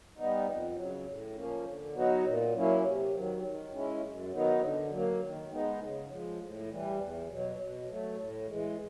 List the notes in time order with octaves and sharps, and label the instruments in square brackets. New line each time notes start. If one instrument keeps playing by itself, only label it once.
[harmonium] G3 B3 D#4
F2
C#3 F#3
A2
F3 A#3 C#4
D3
F#3 B3 D#4 F#4
A#2
F#3 A#3 C#4 E4
C3
D#3 F#3
D#3
G#3 C#4 E4
F#2
D#3 F#3 B3 D#4
D3
F#3 A#3
D#3
G#3 B3 D#4
C#3
F3 G#3
A2
E3 G3
E2
B2 F#3
B2
F#3 A3
A2
E3 G#3